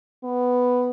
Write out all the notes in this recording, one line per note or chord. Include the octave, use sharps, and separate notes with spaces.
B3